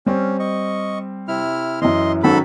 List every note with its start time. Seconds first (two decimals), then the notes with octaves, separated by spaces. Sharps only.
0.06 G3 C4 C#4
0.40 D#5 C#6
1.28 C3 E4 F6
1.82 F#2 E3 D#5 C6
2.23 G#2 D#3 F#3 C#4 A4 B5